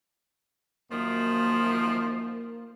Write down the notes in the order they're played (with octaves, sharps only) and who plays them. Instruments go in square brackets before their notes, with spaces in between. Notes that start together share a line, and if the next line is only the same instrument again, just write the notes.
[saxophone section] F#2 D#3 F3 [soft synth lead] A#3